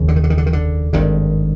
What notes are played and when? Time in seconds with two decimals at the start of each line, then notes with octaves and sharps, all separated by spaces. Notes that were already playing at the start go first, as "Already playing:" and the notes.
Already playing: F1 D#2 C#3
0.08 D3
0.16 D#3
0.24 D3
0.30 D#3
0.38 D3
0.46 D#3
0.53 D3
0.93 G#1 G2 D3 D#3